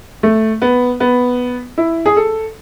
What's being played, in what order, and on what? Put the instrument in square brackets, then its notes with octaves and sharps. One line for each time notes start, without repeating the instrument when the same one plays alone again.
[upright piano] A3
B3
B3
E4
G#4
A4